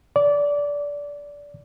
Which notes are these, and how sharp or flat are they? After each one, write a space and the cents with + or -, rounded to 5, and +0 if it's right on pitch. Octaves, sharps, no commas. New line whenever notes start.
D5 -20